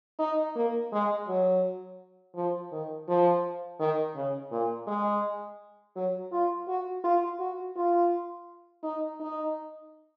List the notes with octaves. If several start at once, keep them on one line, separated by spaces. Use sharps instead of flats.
D#4
A#3
G#3
F#3
F3
D#3
F3
D#3
C#3
A#2
G#3
F#3
F4
F#4
F4
F#4
F4
D#4
D#4